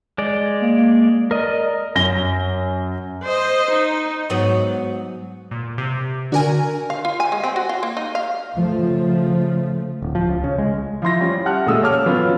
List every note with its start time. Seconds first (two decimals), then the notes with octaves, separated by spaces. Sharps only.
0.18 G#3 D5
0.61 A#3
1.31 A#4 D5 D#5
1.95 F#2 A#6 G7
3.23 C5 D#5
3.71 D#4
4.30 G#2 F#3 B3
5.51 A#2
5.78 C3
6.32 D3 D4 F#4 A#4 G#5
6.90 F5
7.05 F4
7.20 G#5
7.32 G#3
7.44 C4
7.56 F#4
7.69 F4
7.83 A#3
7.97 D#4
8.15 F5
8.56 C#3 F3 A3
10.02 D1
10.15 F3
10.29 C#2
10.44 C#3
10.58 G#3
11.02 F3 E4 C6 A#6
11.21 G3 C#4
11.46 G4 E5 F#5 A5 F6 F#6
11.66 A#2 C#3 G#3 A3 D#6 E6
11.83 C#5 A5 D6 F6
12.06 F#3 B3 C#4 F4 B4